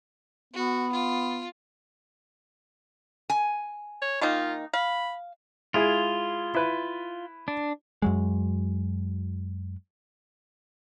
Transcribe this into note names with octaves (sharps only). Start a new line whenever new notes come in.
B3 F#4
F4
G#5
C#5
D#3 A#3 D#4 F4
F5 B5
G#3 E4 F4 G#4
E4 B4
D4
F#2 F#3 G#3